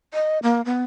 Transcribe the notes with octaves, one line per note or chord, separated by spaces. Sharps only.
D#5
A#3
B3